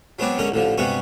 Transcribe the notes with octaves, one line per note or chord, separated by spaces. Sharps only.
F#3 G#3 B3 C4 D4
G#2 D3 C#4 A#4
A1 D3 F3
G2 C3 G#3 B3 F#4